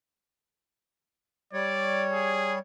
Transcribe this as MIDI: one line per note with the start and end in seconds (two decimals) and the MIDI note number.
1.53 2.59 55
1.53 2.59 73
1.53 2.04 74
2.13 2.56 68